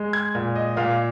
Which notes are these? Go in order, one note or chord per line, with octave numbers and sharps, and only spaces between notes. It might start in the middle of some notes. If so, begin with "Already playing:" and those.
Already playing: G#3
G#6
A#2
D#5
A#2 F5